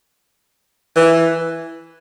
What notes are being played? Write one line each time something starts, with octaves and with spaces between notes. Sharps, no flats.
E3